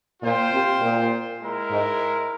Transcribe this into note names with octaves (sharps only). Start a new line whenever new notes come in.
A#2 F4 C5 G5
C3
A#2
G#3 E4 A#4
G#2